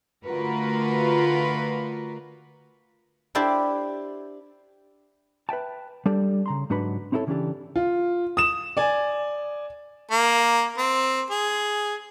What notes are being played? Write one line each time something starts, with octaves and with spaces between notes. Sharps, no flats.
D3 A3 F4 F#4 A#4 B4
D4 E4 G4 C5 D5
B4 E5 G5 A5
G3 D4 G4 A4 D5
C#3 A#5 C6
G#2 F#3 D4 F#4 B4 B5
C4 D#4 E4 F#4 A4 C#5
C#3 E3 C#4 D4 G4 A4
F4
D#6 E7
D5 G#5
A#3
C4
G#4